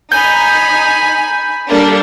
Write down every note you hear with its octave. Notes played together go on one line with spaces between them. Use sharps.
D#4 G#5 B5 G6
G3 A#3 D4 A4